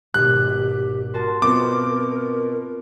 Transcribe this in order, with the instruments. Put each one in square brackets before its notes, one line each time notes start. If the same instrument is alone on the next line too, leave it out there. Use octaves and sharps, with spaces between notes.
[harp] G#1 B2 [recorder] G4 [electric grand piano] F#6
[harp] F#4 A5 C6 [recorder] A#4
[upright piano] B2 B3 [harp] C4 F4 C5 [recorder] A#4 [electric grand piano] D6